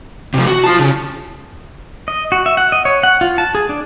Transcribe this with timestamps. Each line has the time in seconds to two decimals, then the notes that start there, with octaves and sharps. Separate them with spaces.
0.34 C3 F3
0.47 F#4
0.64 F4 A5
0.79 C#3
2.08 D#5
2.32 F#4
2.46 E5
2.57 F#5
2.72 D#5
2.85 C#5
3.03 F#5
3.21 F4
3.38 A5
3.55 G#4
3.69 D4